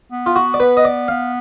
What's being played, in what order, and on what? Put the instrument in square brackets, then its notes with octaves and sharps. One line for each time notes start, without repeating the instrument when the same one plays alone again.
[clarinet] B3
[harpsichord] F4
F#4
D5
[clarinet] B3 [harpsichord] B4
[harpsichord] D#5
D5
[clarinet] B3 [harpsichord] F5